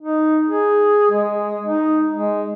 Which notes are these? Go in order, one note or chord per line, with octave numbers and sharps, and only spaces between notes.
D#4
G#4
G#3
D#4
G#3